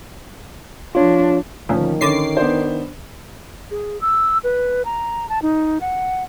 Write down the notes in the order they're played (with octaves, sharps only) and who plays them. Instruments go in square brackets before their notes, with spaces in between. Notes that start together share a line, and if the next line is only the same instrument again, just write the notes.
[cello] F3 D4 [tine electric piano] F4 C#5
[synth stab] D2 A#2 [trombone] D#3 [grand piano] F3 C#4
[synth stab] D3 D6 C7 [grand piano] C#4 C#5
[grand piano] B3 D4 C5
[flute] G#4
E6
B4
A#5
A5
D#4
F#5